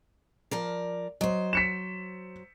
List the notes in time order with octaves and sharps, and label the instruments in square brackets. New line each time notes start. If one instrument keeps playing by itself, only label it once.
[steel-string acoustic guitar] F3 A#4 D5
[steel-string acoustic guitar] F#3 C5 [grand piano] D#5
[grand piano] B6 C#7 E7